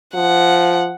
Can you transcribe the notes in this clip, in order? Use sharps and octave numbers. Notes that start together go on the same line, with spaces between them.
F3 F#5